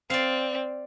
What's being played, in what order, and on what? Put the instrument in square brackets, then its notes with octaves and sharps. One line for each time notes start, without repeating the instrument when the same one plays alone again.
[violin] C4 [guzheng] D5 F5